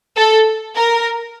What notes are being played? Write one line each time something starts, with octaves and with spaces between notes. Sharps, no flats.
A4
A#4